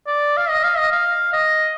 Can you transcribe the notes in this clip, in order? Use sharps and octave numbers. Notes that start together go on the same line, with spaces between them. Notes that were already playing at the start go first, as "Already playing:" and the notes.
D5
F5
D#5
F5
D#5
F5
D#5